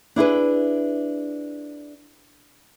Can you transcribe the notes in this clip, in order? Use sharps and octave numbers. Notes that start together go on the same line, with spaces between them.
D4 E4 G#4 B4